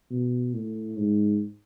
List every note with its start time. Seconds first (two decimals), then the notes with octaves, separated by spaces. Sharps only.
0.10 B2
0.54 A2
0.98 G#2